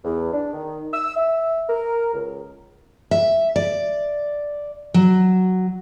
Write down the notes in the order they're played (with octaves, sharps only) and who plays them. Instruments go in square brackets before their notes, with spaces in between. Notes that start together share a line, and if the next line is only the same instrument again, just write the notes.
[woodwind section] E2
D4
D#3
E6
E5
A#4
C#2
[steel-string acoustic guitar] E5
D5
F#3